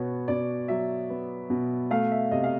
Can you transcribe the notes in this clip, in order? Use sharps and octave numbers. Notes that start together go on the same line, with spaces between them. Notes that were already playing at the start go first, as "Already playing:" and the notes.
Already playing: B2 B3 C#5
B2 D5
F#3 E5
B3
B2
A3 F5
E5
C3 D#5
F5